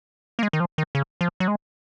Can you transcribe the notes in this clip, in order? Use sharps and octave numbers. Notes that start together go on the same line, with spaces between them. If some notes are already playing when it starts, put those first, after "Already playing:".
A#3
G#3
D#3
F3
D#3
C#3
F3
F#3
G#3